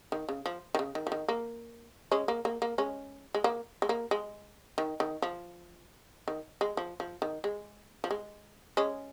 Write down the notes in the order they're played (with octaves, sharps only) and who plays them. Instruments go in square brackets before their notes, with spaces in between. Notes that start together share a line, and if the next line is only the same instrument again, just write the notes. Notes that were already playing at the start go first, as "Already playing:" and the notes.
[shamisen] D#3
C#3
F3
D#3
C#3
D#3
F3
D#3
A#3
G#3 C#4
A#3
A#3
A#3
G#3 C#4
G#3
A#3
G#3
A#3
G#3
D#3
D#3
F3
D#3
G#3
F3
F3
D#3
G#3
F3
G#3
G#3 C#4